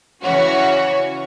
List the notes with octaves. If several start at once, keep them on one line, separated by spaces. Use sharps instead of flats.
C#3 E3 C#4 F#4 C#5